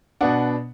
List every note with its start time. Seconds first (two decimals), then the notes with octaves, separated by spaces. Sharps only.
0.21 B2 B3 D4 D5 F#5